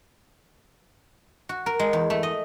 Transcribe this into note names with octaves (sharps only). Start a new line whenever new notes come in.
F#4
A#4
G#3
E2
A3
D#5